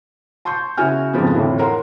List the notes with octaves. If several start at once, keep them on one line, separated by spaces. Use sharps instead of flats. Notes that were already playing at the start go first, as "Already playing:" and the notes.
A5 C6 C#6 G6
C#3 E4 F#4 G#5 F6
F2 G#2 C#3 F3 B3
F2 A2 D3 E3 F3
A#4 C#5 F#5 C6